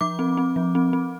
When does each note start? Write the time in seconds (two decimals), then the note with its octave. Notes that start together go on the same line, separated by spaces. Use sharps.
0.01 F3 D6
0.19 C4
0.37 C4
0.56 F3
0.75 C4
0.93 C4